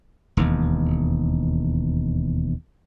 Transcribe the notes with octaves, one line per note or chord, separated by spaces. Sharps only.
E1 D#2